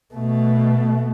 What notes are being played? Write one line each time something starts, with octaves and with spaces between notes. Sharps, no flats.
B2 A3